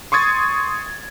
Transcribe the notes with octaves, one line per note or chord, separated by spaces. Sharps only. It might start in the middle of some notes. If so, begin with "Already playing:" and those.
C6 C#6 D#6 G#6 A6